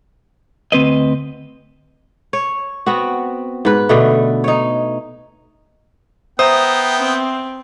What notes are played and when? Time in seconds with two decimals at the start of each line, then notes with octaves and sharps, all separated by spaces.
0.72 D2 C4 B4 D#5
2.33 C#5
2.86 B3 C4 F#4
3.65 G#2 B4
3.89 B2 D3 A3
4.44 D#4 C#5
6.39 B3 C5 E5 G5 A#5 D#6
6.99 C4